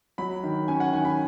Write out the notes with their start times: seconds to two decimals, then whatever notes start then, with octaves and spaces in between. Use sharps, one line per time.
0.18 F#3 B5
0.43 D#3
0.68 C#4 G#5
0.80 F#5
0.92 D#3 G#5
1.05 B5